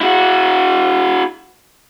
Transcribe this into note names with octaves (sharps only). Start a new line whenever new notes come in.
E4 F#4